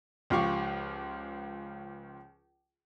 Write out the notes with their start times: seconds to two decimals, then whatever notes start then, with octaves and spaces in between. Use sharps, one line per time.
0.30 C#2 F3 F4 G4 C#6 D6